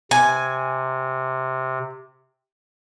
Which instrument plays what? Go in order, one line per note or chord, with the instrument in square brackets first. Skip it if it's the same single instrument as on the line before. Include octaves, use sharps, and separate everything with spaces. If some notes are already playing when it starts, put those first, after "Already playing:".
[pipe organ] C3 [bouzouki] G#5